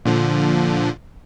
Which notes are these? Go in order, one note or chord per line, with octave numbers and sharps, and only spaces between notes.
A#2 D3 F3